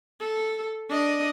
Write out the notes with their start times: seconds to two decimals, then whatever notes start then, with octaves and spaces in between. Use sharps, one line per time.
0.20 A4
0.90 D4 D#5